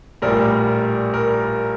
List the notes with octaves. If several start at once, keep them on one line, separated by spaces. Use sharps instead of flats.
A#1 A2 G3 A#4
A#4